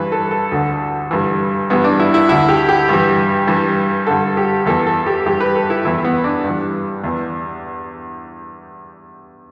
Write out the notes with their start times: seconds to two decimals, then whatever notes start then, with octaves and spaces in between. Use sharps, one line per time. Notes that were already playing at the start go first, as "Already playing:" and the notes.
Already playing: G2 E3 B4
0.12 A4
0.31 A4
0.52 D2 D3
1.11 G2 E3
1.70 G2 E3 B3
1.84 D4
2.00 E4
2.14 E4
2.29 D2 D3 E4
2.49 G4
2.69 G4
2.89 G2 E3
3.47 G2 E3
4.07 G2 D3 A4
4.37 G4
4.66 E2 E3 A4
4.87 A4
5.06 G4
5.26 G2 E3 G4
5.41 B4
5.56 A4
5.70 E4
5.85 E2 E3 E4
6.04 B3
6.24 D4
6.44 G2 E3
7.04 E2 E3